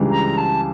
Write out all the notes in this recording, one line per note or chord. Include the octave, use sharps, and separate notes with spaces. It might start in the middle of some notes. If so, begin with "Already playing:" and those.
Already playing: C#2 C#3 E3 G3 D4
A#5
A5